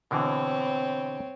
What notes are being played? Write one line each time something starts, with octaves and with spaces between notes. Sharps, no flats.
B2 D3 E3 C4 C#5